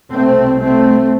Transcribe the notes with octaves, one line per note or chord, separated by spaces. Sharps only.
C2 B2 A3 C4
A3 C4